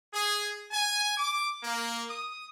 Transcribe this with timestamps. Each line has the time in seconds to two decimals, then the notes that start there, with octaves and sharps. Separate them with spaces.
0.13 G#4
0.71 G#5
1.17 D6
1.63 A#3
2.10 D#6